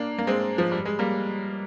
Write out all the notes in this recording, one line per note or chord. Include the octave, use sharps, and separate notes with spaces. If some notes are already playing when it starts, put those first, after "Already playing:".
Already playing: A#3 D4
A#3
G#3 C4
F3
G3
G#3
G3 A#3